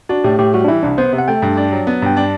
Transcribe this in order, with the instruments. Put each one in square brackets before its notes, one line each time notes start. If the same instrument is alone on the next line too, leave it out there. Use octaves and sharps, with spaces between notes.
[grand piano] D4 [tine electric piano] F#4
[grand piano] A2 [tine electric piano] G4
[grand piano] A2 [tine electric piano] G4
[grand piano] G3 [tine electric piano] F#4
[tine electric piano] D4
[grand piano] E3 [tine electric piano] E4
[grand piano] C2 [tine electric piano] D4
[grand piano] B3 [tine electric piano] C5
[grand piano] C3
[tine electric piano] F#5
[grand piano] A3 [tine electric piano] G5
[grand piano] G2
D4
F#3
B3
[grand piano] G2 [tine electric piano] G5
[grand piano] D4